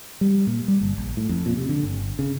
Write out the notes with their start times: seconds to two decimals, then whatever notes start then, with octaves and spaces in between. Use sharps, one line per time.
0.21 G3
0.47 A#2
0.68 G3
0.81 G1
0.97 A#1
1.17 A2
1.29 F2
1.46 A#2
1.57 C3
1.69 D3
1.83 G1
2.19 C#3